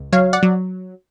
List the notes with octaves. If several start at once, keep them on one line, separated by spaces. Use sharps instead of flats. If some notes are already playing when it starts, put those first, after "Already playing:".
Already playing: C#2
F#3 C#5 F5
D5 F#5
F#3